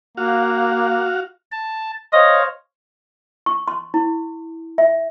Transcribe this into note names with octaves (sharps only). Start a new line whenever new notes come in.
A#3 F#4 F5
A5
C5 C#5 D#5 F5
C#6
C6
E4
E5